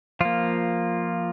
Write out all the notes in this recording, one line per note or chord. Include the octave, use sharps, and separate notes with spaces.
F3 A#3 F4